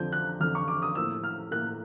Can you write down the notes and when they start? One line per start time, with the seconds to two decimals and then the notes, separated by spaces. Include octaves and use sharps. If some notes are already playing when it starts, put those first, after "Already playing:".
Already playing: F2 D3 F3 G6
0.12 F#6
0.40 F2 D3 F3 F6
0.55 C#6
0.68 D6
0.82 D#6
0.95 A2 F3 A#3 E6
1.23 F6
1.51 A2 F3 A#3 F#6